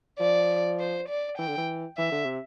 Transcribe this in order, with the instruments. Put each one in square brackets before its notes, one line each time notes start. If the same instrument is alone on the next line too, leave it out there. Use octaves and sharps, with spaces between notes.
[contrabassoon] F3 [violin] D5
[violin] C5
D5
[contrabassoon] E3 [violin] G5
[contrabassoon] D3
E3
[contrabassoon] E3 [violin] E5
[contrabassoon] D3
C3